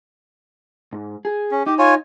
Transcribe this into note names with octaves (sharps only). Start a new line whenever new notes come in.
G#2
G#4
C#4
D#4 G4
F4 C#5 G#5